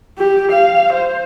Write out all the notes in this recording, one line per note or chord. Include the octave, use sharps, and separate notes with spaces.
G4
F5
C5